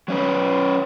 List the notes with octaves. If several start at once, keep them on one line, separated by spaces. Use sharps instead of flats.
F#3 C#4 B4